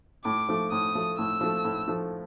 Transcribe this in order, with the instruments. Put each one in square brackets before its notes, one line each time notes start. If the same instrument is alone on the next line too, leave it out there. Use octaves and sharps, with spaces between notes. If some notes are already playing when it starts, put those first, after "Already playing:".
[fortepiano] A2 [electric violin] D6
[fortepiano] F3 A3
[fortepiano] A2 [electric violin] D#6
[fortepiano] F3 A3
[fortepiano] A2 [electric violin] E6
[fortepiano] F3 A3
A2
F3 A3